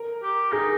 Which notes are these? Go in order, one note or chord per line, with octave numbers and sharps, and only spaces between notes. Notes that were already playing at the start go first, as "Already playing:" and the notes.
Already playing: A#4
G4
D#4 G#4